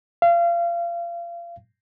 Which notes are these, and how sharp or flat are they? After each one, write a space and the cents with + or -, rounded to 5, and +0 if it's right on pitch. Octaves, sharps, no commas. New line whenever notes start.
F5 -30